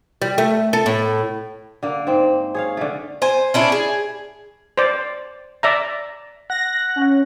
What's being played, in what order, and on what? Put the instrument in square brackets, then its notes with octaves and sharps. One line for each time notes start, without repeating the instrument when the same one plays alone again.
[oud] G3
A3
A4
A2
[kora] D3 A#3
G#2 C4
G#4 C#5 F5
D3 A3
[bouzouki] C5 G#5
C#4 D4 E4 G#4
G#4
[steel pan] C5 D5
D5 E5 A#5
[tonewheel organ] F#5 [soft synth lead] A#6
[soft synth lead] C#4